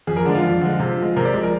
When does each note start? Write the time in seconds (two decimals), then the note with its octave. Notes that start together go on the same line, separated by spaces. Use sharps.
0.07 F2 G#4
0.17 A#4
0.25 D3 F3 G#3 D4
0.35 F4
0.44 F2
0.61 D3 F3 G#3
0.79 C3
0.98 F3 G#3
1.16 C3 A#4
1.25 D5
1.34 F3 G#3
1.43 A#4